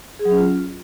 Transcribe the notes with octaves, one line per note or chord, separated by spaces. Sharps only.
G#4
F#3
C#4
F4